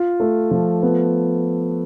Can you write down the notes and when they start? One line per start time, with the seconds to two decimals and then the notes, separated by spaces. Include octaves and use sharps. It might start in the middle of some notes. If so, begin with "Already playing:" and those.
Already playing: F4
0.20 A3
0.51 F3
0.83 B3